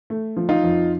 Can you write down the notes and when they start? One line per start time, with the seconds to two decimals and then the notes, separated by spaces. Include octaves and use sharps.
0.10 A3
0.37 F3
0.49 D#4 F4
0.63 F2